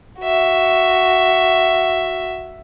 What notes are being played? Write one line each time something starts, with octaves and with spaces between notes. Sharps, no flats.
F#4 E5